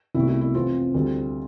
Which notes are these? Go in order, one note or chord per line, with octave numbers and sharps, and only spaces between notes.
C2 B2 A3 E4
E4
E4
F2 C3 E3 F4
D2 C3 G3